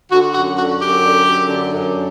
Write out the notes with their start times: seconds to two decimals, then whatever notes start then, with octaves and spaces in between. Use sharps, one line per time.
0.12 D3 F#4
0.34 F#2 F#4
0.58 D3 F#4
0.81 F#2 G4
1.03 D3
1.27 F#2
1.49 D3
1.73 F#2